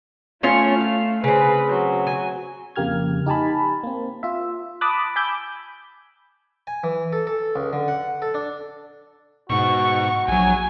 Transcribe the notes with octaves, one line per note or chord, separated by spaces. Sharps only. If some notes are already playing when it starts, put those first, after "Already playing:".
A3 C#4 F4 C#5
F5
C#3 C4 B4
F#3
G#5
F2 C#3 A#3 G4 F6 G#6
D#4 G4 G#5 A5 B5
A#3 C4
F4 E5
A5 B5 D6 D#6 F#6
G#5 B5 D6 E6 G6
G#5
E3
A4
A4
C#2
D3
F#5
A4
D4
G#2 B2 F#4 C#6
A#1 F#3 G#5